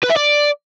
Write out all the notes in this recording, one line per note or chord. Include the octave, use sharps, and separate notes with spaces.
B4
E5
D5